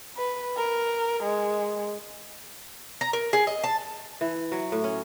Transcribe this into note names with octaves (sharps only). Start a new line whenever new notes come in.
B4
A#4
G#3
A#5
A#4
G#4
D#5
A5
E3
F#3
A2
C#4